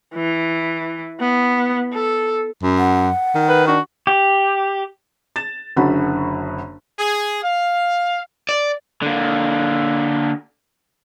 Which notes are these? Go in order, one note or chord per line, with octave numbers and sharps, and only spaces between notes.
E3
B3
A4
F#2
F#5
D#3
B4
D4 F#4
G4
A6 E7
F#1 F#2 D3 F#4 F#5 B5
G#4
F5
D5
D3 A#3